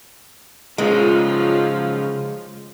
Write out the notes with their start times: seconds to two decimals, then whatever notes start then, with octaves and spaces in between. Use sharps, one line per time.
0.78 C#3 F3 F#3 G#3 D#4 F4